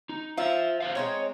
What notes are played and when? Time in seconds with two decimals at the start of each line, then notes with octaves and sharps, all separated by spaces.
0.09 D#4
0.38 F4 C5 E5 F5
0.81 B4 C5 F5
0.95 G#3 C4 D#4 C#5